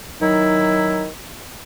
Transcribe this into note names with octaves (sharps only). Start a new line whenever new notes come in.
D#3 F#3 D#4 E4